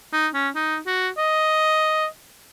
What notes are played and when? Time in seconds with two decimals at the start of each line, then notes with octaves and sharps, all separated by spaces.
0.13 D#4
0.34 C#4
0.55 D#4
0.87 F#4
1.18 D#5